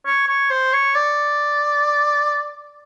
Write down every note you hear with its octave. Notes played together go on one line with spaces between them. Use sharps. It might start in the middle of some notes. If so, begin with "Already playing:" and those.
C#5
C#5
C5
C#5
D5